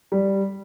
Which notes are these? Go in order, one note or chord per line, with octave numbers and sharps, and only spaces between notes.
G3